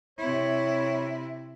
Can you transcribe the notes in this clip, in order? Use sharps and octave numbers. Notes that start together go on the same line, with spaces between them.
C3 E4 C#5